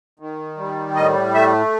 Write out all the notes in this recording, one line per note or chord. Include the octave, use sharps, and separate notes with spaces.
D#3
G3
A2 D#5
A3 E5